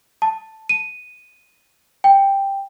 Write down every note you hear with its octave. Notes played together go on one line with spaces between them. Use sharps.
A5
D#7
G5